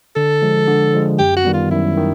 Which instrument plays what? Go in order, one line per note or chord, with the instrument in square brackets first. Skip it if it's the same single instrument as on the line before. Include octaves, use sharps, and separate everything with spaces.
[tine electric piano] D3 [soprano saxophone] A4
[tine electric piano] F3 G#3
D3
F3 G#3
[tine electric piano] F#2 [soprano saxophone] G4
[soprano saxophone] F#4
[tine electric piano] D#3 G3 B3
[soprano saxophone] F4
[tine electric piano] F#2 [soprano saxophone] E4
[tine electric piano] D#3